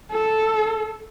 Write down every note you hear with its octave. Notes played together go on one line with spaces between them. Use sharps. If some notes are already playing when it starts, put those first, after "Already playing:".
A4